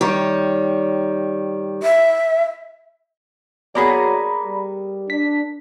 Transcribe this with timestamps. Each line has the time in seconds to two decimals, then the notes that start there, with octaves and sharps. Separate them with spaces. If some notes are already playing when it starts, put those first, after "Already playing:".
0.01 D#3 G3 C#5
1.83 E5
3.75 F#3 A#3 B3 G#4 D5 A#5 B5
4.44 G3
5.10 D4 B6